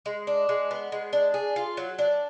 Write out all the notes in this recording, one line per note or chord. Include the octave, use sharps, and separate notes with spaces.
G#3
D4
G#3
B3
G#3
D4
G#4
F4
F#3
D4